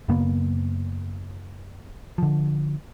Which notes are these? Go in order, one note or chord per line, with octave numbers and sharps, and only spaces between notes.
F#2 C#3 A#3 B3
D3 F3